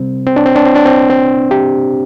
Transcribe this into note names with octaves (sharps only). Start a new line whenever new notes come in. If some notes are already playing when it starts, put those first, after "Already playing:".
Already playing: C3 G3 C4
C4
D4
C4
D4
C4
D4
C4
C4
G4